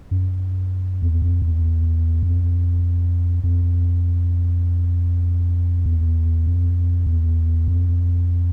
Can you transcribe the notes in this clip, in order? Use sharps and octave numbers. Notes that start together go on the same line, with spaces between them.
F#2
E2
F2
E2
F2
F2
E2
F2
E2
F2